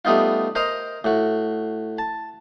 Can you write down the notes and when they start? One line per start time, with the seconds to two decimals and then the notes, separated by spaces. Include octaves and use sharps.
0.05 G3 A3 B3 D#4 F4
0.55 A#4 C5 D#5 A#5
1.04 A2 F#4
1.98 A5